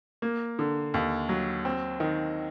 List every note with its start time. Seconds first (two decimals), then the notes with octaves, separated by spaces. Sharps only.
0.22 A#3
0.59 D3
0.94 D#2
1.29 F#3
1.65 C4
2.00 D#3